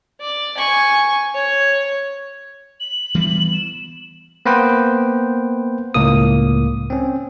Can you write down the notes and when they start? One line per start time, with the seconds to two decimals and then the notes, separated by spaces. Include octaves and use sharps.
0.21 D5
0.57 G#5 C#6
1.35 C#5
2.80 F#7
3.15 E3 G3 B3
3.54 E7
4.46 A#3 B3 B4 C5 G5
5.94 C#2 A2 A#3 D#6
6.90 C4 C#4